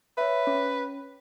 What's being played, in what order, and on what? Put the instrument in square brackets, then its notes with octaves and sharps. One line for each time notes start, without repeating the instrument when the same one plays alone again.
[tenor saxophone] B4 [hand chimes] C#5 E5
[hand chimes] C#4